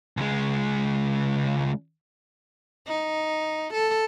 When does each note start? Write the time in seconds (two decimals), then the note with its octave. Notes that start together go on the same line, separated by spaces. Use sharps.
0.17 C#2 G#3
2.87 D#4
3.74 A4